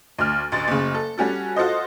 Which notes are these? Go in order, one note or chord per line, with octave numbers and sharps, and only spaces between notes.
D2 F6
A1 D2 C6 A6
F#1 C#3
A4
G3 C#4 F#4 A4
F4 F#4 A4 C5 D#5